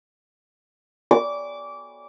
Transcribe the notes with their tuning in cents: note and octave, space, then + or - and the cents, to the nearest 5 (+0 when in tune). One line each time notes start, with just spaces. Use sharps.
D6 -20